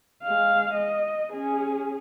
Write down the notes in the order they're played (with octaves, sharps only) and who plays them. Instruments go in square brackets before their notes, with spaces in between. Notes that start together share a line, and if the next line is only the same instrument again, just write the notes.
[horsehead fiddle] G#3 F5
D#5
C#4 G#4